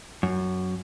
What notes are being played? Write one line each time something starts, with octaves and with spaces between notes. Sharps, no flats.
F#2